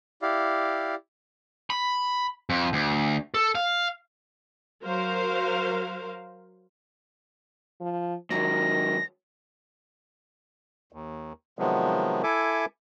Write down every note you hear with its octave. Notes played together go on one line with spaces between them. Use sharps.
E4 G4 D5 F5
B5
F2
D2
A4
F5
F#3 A#4 C5 F5
F3
G#2 D#3 F#3 A#6
D#2
C3 D#3 F3 F#3 G#3 B3
E4 A4 E5 G#5 D6